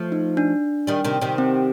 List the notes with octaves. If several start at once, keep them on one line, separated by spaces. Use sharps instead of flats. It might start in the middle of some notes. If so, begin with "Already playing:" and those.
Already playing: F3 A3
D#4
D4
D#3 G3
C3 D#3
C3 D#3
C4